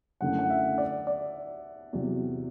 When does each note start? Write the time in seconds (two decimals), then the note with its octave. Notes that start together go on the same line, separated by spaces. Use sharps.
0.21 F#2 D3 A3 E4 F#5
0.39 F#5
0.50 E5
0.78 D5
1.07 D5
1.93 E2 C3 F#3